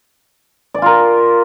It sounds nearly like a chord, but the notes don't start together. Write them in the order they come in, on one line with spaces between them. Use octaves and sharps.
D5 G#5 F4 A#4